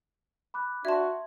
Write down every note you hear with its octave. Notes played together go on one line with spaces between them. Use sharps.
B5 D6 F#6
D4 F#4 E5 A5 C6 G#6